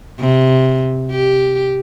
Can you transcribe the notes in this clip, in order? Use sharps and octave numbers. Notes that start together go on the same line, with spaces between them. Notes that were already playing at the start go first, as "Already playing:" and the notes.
C3
G4